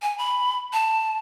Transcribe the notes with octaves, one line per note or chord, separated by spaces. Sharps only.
G#5
B5
A5